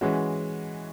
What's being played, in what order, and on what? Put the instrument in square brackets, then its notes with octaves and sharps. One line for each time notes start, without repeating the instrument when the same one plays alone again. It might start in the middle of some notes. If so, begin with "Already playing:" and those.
[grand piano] E3 G#3 C#4 F#4